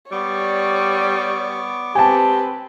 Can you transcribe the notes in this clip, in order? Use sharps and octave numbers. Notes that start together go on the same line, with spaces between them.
G3 B3 C#5 D5 C#6 D6
C4 G4 B4 G#5 A5